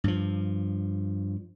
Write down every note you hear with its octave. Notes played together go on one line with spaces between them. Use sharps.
G2 F3